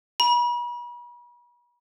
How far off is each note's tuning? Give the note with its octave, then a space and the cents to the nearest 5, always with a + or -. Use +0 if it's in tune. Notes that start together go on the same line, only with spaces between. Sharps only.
B5 -40